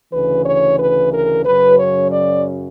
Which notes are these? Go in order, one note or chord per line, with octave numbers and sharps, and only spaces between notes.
D2 C#3 E3 B4
C#5
B4
A#4
F#2 C#3 F#3 B4
C#5
D5